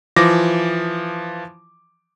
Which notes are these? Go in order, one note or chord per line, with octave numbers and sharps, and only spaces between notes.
E3 F3 D6 A#6